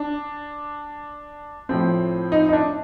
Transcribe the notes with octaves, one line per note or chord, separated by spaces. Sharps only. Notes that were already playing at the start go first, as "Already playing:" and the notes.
Already playing: D4
A2 F3 C4
D#4
D#4
D4